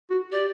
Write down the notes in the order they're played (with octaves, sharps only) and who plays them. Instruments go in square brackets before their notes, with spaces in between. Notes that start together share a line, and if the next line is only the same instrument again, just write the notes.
[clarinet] F#4
[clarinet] G4 [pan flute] D5